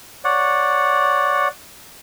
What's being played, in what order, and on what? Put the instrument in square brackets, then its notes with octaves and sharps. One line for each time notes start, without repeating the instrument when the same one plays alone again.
[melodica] C#5 D5 F#5